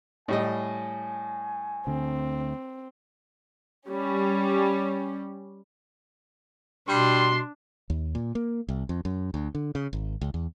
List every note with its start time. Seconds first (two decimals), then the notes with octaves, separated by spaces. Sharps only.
0.28 A2 G3 D#5 G#5
1.87 D2 D3 C4
3.89 G3 C#4
6.88 B2 G3 D4 C6
7.90 D#2
8.15 A#2
8.35 A#3
8.69 C2
8.89 F2
9.05 F#2
9.34 D2
9.55 D3
9.75 C#3
9.93 G#1
10.21 C#2
10.34 E2